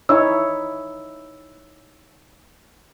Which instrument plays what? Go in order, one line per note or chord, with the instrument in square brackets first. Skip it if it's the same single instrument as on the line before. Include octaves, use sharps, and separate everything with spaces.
[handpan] D#4 E4 C#5 [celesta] E6